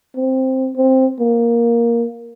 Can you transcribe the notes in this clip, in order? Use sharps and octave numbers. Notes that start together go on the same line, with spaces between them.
C4
C4
A#3